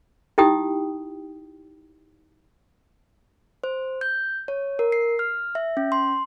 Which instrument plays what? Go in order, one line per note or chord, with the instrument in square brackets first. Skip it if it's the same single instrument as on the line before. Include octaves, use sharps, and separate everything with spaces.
[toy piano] D#4 E4 G4 G5 D#6
[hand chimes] C5
G6
C#5
A#4
C7
F6
E5
C#4
C6